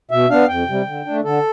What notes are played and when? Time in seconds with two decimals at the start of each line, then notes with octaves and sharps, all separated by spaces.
0.11 B2 E5
0.30 B3 D4 F5
0.48 F2 G5
0.67 C3 G3
0.87 D3
1.05 A3 D4
1.24 D3 A4